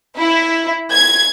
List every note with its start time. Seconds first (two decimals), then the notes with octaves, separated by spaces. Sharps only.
0.17 E4
0.92 G#6